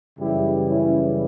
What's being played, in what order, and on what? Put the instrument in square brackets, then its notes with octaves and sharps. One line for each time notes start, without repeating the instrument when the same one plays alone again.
[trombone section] F#2 C#3 E3 G3 E4 G4
C#4 E4